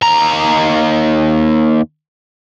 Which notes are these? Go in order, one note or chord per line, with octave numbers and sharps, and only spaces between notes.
D#2 A#5